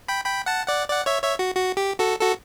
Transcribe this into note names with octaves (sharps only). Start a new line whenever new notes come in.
G5 B5
G5 B5
F#5 A5
D5 F#5
D5 F#5
C#5 E5
C#5 E5
F#4
F#4
G4
F#4 A4
F#4 A4